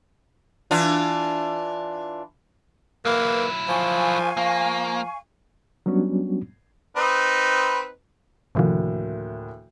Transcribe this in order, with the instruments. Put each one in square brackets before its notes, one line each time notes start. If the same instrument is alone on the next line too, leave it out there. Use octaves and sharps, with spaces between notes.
[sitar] E3 D4 F4
[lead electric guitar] F#3 E4 [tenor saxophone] A#3 [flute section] B4
[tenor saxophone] F3 [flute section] F5 G#5 C#6
[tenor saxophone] F3 [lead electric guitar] A#3
[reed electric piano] F#3 G3 B3 C#4 D4 F#4
[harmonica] C4 D#4 B4
[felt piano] D2 A2 A#3 [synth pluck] C3 D#3 F3